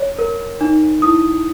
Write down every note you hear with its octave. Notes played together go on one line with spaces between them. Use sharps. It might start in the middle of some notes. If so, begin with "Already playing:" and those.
Already playing: C#5
A#4
D#4
E4 D#6